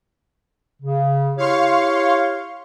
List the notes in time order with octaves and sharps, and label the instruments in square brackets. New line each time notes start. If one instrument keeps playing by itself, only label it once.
[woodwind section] C#3
[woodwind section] E4 G4 C#5 [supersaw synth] F5 C6 C#6